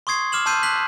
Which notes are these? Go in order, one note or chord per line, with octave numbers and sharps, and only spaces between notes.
C6 C#6 D#6 G#6 C7
D6 F6 E7 F#7
A5 C6 E6 G6 C7 D#7
F#6 B6 F#7